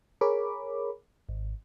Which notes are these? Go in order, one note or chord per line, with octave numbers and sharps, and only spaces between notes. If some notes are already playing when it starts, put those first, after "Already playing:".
G#4 A#4 C#5 B5 D6
G#1